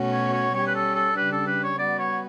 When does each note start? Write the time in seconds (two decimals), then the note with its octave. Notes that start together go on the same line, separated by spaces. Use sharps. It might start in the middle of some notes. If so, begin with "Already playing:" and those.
Already playing: B2 A3 C#4 F#4
0.12 C#5
0.33 C#5
0.54 G3 C#4 G4 C#5
0.67 B4
0.75 A4
0.95 A4
1.16 C#3 G3 D4 G4 B4
1.32 A4
1.47 B4
1.63 C#5
1.78 G3 B3 F#4 D5
1.99 C#5